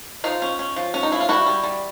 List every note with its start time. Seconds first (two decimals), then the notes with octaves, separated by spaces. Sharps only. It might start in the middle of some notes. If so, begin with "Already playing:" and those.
0.24 F3 D#4 F4
0.42 C#4
0.59 C#4
0.76 F3
0.94 C#4
1.03 D#4
1.12 F3 E4
1.20 F4
1.29 G3 E4 F#4
1.46 G3
1.63 G3